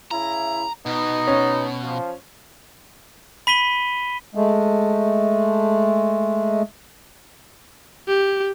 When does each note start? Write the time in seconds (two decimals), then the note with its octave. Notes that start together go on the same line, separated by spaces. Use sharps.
0.11 C#3 E4 A#5
0.86 B2 B3 D#4
1.27 C#4
1.83 F3
3.47 B5 B6 D#7 G7
4.35 G#3 A3
8.08 G4